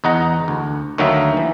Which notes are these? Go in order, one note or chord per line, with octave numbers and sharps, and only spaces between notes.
E2 D#4 F#5 A#5
D2
D2 D#3 F#3 A#3 D#4 E5
E3